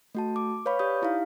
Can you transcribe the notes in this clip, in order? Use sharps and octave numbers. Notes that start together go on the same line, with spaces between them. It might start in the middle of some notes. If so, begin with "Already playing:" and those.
A3 F#4 A5
D6
B4 C#5 F5 B5 C#6
G4 D5 D#6 G6
D#4 E4 G4 F5